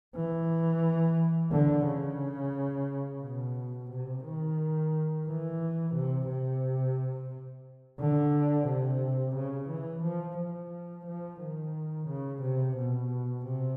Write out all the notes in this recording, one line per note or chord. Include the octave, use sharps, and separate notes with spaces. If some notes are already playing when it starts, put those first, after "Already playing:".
E3
D3
C#3
B2
C3
D#3
E3
C3
C3
D3
C3
C#3
E3
F3
F3
F3
D#3
C#3
C3
B2
C3